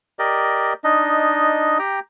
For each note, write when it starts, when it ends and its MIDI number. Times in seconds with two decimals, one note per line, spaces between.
0.19 0.73 67
0.19 0.73 70
0.19 0.73 74
0.19 0.73 75
0.84 1.78 62
0.84 1.78 63
0.84 1.78 75
1.79 2.00 67
1.79 2.00 79
1.79 2.00 82